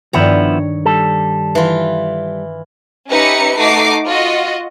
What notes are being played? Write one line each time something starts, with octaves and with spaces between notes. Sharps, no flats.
G2 D#3 F3 B3 E4 C#5 A#5
G3 A4
E3 F4
C#4 D#4 G4 B4 E5 C#7
A3 D#4 F#4 D6 C7
F4 F#4 D#5